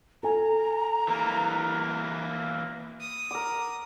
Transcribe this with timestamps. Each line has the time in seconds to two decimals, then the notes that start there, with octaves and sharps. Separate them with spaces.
0.23 A4 G#5 A#5
1.08 E3 A#3
3.00 D#6
3.31 A#4 D6